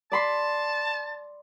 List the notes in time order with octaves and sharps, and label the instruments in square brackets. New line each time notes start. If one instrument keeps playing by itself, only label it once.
[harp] D5 B5 C6 [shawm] A5